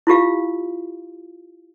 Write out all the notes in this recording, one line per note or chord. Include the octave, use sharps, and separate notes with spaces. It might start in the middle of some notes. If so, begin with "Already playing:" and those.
E4 F4 G4 F5